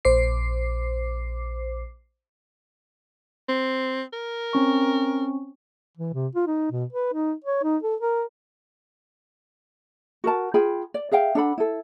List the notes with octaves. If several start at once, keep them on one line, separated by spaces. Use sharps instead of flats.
A#1 C5 D6 C7
C4
A#4
C4 C#4 C#6
E3
C3
F4
D#4
B2
B4
D#4
C#5
D#4
A4
A#4
F#4 A#4 A5
F4 G#4 G5 B5
D5
G#4 E5 F5 G5
D4 A4 F#5 B5
E4 A4